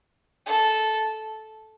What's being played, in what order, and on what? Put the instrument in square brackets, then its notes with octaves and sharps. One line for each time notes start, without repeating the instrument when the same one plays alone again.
[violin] A4